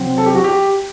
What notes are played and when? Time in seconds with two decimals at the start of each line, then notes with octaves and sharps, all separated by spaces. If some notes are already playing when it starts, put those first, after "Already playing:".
Already playing: C3 F#3 C4
0.18 A4
0.26 G4
0.35 F#4
0.44 G4